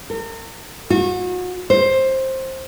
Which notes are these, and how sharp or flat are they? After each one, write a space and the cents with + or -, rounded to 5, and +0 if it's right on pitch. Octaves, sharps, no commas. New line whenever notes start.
A#4 -40
F#4 -35
C5 +15